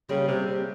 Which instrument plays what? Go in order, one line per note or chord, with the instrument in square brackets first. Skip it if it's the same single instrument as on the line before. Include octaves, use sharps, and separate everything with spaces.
[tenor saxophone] C#3 [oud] G3 A#3
[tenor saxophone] C3
C3